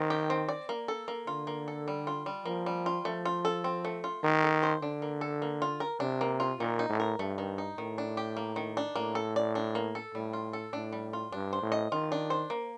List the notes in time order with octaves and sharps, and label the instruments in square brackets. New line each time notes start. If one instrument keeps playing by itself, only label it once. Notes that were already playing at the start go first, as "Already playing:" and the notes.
Already playing: [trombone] D#3 [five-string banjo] C4
[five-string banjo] G4
C4
D5
A#3
A4
A#3
[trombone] D3 [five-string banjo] F4
[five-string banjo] A#3
A4
G3
F4
G3
[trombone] F3 [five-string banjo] A#3
[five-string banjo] G3
F4
[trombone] F3 [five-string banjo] A3
[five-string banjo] F4
A4
C4
A3
F4
[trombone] D#3 [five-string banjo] A#3
[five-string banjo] A4
C5
[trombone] D3 [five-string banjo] D4
[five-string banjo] A#3
A4
A#3
F4
A#4
[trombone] C3 [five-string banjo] D4
[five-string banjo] A#3
F4
[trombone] A#2 [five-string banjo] D#3
[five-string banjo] D#4
[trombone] A2
[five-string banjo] A#4
[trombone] G2 [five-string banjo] A3
[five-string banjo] D#3
D#4
[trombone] A2 [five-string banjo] D#3
[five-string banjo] D4
G4
A#3
D#3
D4
[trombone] A2 [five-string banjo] A#3
[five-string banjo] A4
D5
D4
A#3
A4
[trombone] A2 [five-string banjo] G3
[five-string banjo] F4
A4
[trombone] A2 [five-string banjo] D4
[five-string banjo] G3
F4
[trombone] G2 [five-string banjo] D4
[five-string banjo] C5
[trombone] A2
[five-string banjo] D#5
[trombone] D#3 [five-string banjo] F4
[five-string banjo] D4
C5
A#3